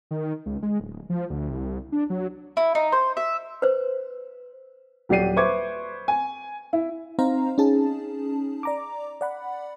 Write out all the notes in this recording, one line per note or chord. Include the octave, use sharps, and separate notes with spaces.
D#3
C#2
G#3
D1
F3
D2
C2
D4
F#3
E4
D#4
C5
E5
B4 C5
D#1 F#3 G4 D5 C7 D#7
B4 C5 E5 C#6 D6 G#6
G#5
E4
C4 D#4 C5 F5 A#5
C#4 D#4 G#4 A5
D5 A#5 D6
D5 F#5 B5